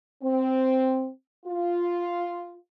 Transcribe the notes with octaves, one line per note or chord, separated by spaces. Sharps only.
C4
F4